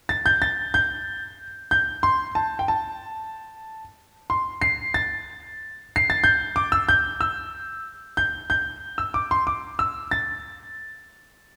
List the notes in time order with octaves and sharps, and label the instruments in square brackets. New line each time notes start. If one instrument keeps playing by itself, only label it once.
[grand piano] A6
G6
A6
G6
G6
C6
A5
G5
A5
C6
C7
A6
C7
A6
G6
D6
E6
G6
E6
G6
G6
E6
D6
C6
D6
E6
A6